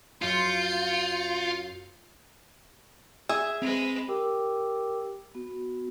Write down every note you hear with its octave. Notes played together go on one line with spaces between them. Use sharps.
F#2 F4 C6 G6 C#7
G#4 E5
G#3 C4 B4
G4 A#4 G5 D6 E6
B3 F#4